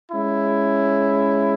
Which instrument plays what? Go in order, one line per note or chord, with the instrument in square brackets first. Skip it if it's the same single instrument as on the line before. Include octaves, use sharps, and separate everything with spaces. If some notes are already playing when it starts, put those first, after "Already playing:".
[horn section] G#3 C#4 E4